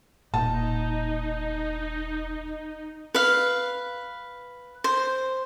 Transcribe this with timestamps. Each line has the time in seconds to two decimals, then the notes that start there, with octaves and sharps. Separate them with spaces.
0.34 E1 A#2 D#4 A5
3.15 B4 F5
4.84 C5